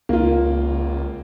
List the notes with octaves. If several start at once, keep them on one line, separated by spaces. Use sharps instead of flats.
C#2 A#3 F4